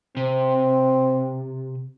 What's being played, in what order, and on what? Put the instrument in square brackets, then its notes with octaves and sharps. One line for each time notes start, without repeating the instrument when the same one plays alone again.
[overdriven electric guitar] C3 [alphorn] C4